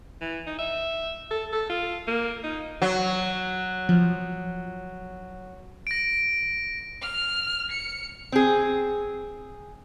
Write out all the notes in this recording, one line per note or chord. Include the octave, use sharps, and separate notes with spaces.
E3
D#4
E5
A4
A4
F4
A#3
D#4
F#3
F3
A#6 D7
F6
C#7
C4 G#4